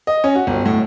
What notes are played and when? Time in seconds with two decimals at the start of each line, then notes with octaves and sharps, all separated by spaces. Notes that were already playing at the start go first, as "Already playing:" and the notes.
0.07 D#5
0.24 C#4
0.35 F#4
0.47 G1
0.65 A2